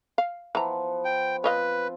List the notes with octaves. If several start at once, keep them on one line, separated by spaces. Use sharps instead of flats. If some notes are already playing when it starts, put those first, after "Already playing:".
F5
E3 F3 B3 A#5
G5
C4 F4 B4 C#5 D#5 F5